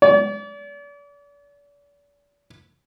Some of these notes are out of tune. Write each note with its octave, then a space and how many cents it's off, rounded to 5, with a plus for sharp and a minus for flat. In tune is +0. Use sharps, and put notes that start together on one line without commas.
D5 -40